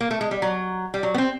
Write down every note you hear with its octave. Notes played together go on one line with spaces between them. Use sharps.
A#3
A3
G#3
G3
F#3
G3
F#3
B3
C4